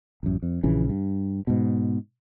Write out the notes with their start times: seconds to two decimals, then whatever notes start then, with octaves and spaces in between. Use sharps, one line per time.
0.23 A1 F#2
0.42 F2
0.63 A#1 C#3 E3
0.90 G2
1.47 G#2 B2